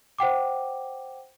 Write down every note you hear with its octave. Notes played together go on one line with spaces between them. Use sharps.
C5 F#5 G5 D6